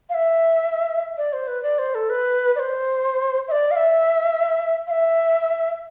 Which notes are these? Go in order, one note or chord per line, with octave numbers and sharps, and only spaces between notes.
F5
E5
D5
C5
B4
D5
C5
A4
B4
D5
C5
E5
D5
F5
E5
F5
E5